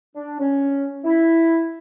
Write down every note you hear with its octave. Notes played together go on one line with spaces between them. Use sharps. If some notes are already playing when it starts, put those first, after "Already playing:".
D4
C#4
E4